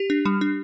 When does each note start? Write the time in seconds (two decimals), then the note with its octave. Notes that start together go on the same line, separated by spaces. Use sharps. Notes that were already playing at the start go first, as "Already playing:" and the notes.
Already playing: G4
0.10 D4
0.25 G3
0.41 D4